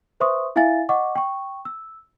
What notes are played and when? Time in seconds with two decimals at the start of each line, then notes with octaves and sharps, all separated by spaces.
0.20 B4 C5 E5 C6 C#6 D#6
0.56 E4 E5 F5 G#5 A6
0.89 D#5 F#5 C#6 D6
1.16 G5 C#6
1.65 E6